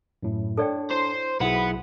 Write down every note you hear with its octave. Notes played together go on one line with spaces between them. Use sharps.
F#2 A2
D4 A4 C#5 D5 G5
E4 C5
B1 E4 F#4 G#4 B4 F#5